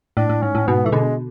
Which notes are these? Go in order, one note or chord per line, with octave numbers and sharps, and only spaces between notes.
A2 D4
A2
G#2 C#4
A2
G#2 B2 B3
E3 A3
B2 D3 G#3